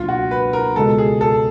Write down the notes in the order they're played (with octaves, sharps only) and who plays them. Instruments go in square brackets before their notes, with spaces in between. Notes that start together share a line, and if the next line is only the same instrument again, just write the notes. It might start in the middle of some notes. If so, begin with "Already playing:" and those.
Already playing: [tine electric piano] C#2 B2 F#3 A#3 D4 [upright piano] F4
[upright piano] F#4
B4
A#4
[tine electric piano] C#2 B2 G#3 [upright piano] A4
[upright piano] G#4
A4